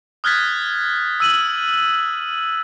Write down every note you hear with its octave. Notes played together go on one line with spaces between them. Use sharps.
D#6 F6 F#6 G#6 A6 B6
E6 D#7 F#7